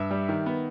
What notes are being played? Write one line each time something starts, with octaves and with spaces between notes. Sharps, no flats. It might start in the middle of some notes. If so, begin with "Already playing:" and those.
Already playing: G2 E5
G3
D#3
B3